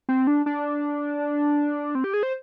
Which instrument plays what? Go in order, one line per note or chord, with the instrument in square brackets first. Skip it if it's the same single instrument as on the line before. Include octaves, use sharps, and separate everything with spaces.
[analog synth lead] C4
D4
D4
C4
G4
G#4
C5